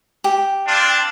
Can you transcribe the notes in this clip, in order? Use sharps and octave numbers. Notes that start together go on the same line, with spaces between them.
G4
C4 D4 F4